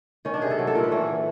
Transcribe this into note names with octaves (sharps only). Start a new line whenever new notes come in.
D#3 C#4
D4
C3 G#4
A4
F#3
A4
A#2 A#4
B4
E3 C#5